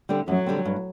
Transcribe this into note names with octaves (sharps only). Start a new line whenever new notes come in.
D3 G3 C4
F#2 F#3
D3 G3 C4
G2